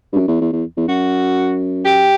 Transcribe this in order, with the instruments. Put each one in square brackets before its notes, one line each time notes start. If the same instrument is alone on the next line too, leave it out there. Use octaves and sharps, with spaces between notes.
[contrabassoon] G2
F#2
E2
E2
E2
E2
[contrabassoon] F#2 [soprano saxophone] F#4
[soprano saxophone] G4